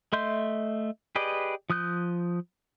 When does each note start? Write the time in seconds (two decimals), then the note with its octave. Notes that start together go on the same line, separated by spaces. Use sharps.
0.13 A3 D#5 E5 C6 G6
1.16 G4 G#4 B4 D5 D#5
1.70 F3 D#6 F#6 G6